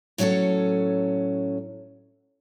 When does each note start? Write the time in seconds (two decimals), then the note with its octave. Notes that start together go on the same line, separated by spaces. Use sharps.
0.18 A2 F#3 C#4 D#4 A4 C#5